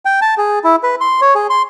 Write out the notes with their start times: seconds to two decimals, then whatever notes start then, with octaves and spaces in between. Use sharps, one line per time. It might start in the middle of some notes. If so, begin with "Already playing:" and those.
0.05 G5
0.22 A5
0.38 G#4
0.64 E4
0.83 B4
1.01 C6
1.21 C#5
1.35 G#4
1.50 C6